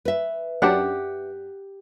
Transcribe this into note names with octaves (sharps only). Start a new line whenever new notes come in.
B4 E5
F#2 D4 G4 F#5